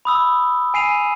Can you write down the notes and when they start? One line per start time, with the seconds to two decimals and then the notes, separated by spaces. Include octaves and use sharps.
0.05 B5 D#6 E6
0.74 G#5 C7 D#7 F7